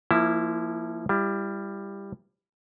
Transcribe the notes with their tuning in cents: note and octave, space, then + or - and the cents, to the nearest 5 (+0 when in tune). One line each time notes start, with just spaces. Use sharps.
F3 -25 A#3 +0 E4 +0
G3 +15 E4 +35